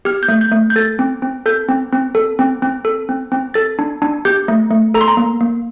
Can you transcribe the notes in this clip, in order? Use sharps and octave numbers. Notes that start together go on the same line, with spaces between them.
G4 F6
G6
A3
G6
A3
G6
A4 A6
C4
C4
A4 G6
C4
C4
A4
C4
C4
A4
C4
C4
A4 A6
D4
D4
G4 G6
A3
A3
A4 A#5
C6
A#5
A#3
A#3